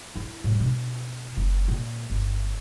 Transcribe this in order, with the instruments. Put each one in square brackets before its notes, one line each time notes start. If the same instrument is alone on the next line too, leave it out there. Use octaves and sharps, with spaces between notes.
[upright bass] E4
A2 G3
B2 D4
F#1
A#2
G1